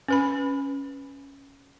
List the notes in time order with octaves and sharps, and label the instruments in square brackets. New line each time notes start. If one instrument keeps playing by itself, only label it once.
[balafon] C#4 B4 B5